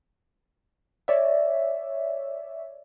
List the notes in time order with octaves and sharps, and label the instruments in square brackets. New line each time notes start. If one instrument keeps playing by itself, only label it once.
[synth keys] C#5 D5 E5